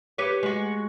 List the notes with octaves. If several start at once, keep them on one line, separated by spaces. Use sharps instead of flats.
G4 B4 C#5
G#3 F#4